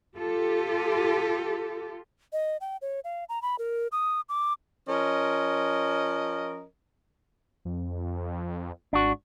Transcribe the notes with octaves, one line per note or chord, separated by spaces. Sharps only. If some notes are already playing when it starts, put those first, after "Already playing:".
F4 G4 A4
D#5
G5
C#5
F5
A#5
B5
A#4
D#6
D6
F3 C#4 A#4 D#5
F2
G#1 D4 F#4